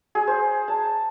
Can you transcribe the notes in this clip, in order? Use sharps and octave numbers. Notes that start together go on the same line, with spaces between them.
G#4
C5
A5